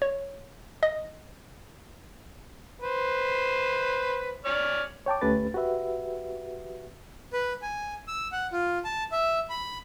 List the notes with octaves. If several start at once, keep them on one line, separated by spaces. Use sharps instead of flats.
C#5
D#5
B4 C5
C#5 D5 F6
C#5 G5 A5 D6
D2 A3 C#4 G4 B4 A6
F#4 G4 B4 E5
B4
G#5
E6
F#5
F4
A5
E5
B5